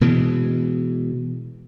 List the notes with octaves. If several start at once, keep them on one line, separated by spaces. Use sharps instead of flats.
B2 E3 G#3